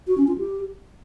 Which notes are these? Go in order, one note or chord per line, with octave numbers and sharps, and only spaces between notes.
F#4
C#4
F4
G4